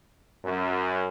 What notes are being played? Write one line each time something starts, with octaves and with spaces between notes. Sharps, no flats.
F#2